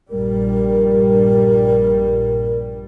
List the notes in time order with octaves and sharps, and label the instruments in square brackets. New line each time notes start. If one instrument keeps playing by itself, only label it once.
[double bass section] A#1 G2 G3 [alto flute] A#4